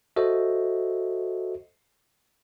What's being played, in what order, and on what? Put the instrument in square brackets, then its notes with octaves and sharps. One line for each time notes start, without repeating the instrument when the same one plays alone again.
[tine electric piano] F#4 A4 C5 D#5 E5